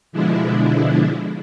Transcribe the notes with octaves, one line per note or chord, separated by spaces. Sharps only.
B2 D3 F3 G#3 D4 E4